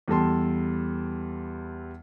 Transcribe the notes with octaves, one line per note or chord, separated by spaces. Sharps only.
E2 G3 A4 A5 C6